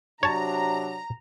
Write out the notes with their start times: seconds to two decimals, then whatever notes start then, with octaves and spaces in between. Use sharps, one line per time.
0.23 C3 F#3 D4 C#5 A5 A#5